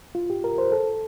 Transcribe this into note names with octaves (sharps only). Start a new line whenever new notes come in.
F4
G4
A#4
C5
A4